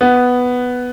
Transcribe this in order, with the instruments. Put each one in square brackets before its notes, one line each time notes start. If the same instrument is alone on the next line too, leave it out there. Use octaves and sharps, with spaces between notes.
[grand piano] B3